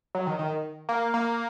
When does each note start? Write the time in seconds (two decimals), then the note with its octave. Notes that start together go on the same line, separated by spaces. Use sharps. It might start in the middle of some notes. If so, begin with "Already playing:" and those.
0.15 F#3
0.27 D#3
0.39 D#3
0.89 A#3
1.14 A#3